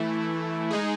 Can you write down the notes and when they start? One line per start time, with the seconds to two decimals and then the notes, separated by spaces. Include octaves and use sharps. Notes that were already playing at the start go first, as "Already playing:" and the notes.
Already playing: E3 A3 E4
0.71 G#3 D#4 G#4